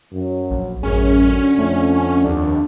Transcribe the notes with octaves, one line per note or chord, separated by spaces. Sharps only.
F#2 F#3
A#1
A1 F#2 C#4 G#4
D3
F2 A3
D#2 D4